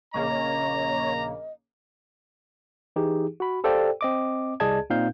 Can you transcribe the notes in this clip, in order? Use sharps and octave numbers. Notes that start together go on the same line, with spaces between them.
A#1 C#3 A#3 C#5 D#5 A#5
E3 D#4 G4 G#4
F#4 B5
G4 A4 C5 D5 F5 G5
C4 D#5 D6
C2 G#4 D5 D#5 A5 G#6
A#2 C4 D#4 F5 G6